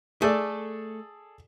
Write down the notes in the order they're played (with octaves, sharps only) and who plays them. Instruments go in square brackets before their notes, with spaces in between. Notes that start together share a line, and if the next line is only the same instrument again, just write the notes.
[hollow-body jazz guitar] A3 [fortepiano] G#4 A4 D5